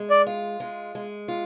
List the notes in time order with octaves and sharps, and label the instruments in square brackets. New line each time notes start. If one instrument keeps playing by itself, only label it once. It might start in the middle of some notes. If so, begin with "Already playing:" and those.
Already playing: [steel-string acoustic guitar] G#3
[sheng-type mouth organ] D5
[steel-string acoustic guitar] F4
G#3
G#3
F4